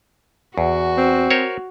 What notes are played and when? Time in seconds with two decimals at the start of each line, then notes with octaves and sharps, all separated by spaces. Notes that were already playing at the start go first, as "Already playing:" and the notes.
0.58 E2 F#4
0.97 C4
1.31 A#4 C5 C#5